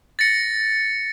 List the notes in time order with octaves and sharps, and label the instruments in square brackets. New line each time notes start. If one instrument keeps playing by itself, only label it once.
[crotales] A6 A#6 C#7